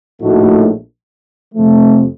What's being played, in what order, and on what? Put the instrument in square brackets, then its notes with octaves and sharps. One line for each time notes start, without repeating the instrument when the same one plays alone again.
[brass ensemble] A#1 A2 A3 D#4 F#4
F2 C3 F3 A3